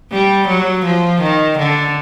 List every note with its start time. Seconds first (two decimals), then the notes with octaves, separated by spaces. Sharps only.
0.12 G3
0.48 F#3
0.85 F3
1.21 D#3
1.59 D3